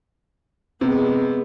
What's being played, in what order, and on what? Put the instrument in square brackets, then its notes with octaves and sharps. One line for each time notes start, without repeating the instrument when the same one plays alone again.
[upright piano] C3 [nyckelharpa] G#3 B3